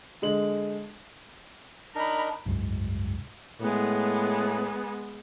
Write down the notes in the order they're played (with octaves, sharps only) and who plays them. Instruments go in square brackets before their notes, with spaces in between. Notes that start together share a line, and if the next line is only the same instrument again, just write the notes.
[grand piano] D3 G#3 F#7
[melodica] D4 D#4 A#4 [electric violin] A#5 B5
[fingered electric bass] F#1 C2 G#2
[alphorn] A2 [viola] G#3 B3